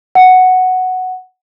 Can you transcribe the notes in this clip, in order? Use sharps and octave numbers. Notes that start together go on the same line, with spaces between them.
F#5